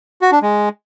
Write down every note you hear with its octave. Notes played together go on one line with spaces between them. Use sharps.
F#4
D4
G#3